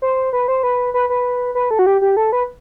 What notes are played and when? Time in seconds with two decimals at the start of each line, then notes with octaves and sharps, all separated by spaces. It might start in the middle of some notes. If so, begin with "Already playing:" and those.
0.02 C5
0.33 B4
0.48 C5
0.63 B4
0.94 B4
1.10 B4
1.55 B4
1.71 A4
1.79 F#4
1.86 G4
2.01 G4
2.17 A4
2.32 B4